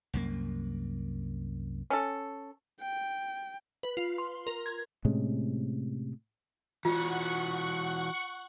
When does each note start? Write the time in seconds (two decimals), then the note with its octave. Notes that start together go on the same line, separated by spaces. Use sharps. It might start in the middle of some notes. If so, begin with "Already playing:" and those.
0.14 C2 F#2 A#3
1.90 C#4 A4
2.81 G5
3.83 B4
3.97 F4
4.18 C6
4.47 A#4
4.66 G#6
5.05 A2 C3 G#3 C#4
6.85 E3 F4 F#4 F#5 C#6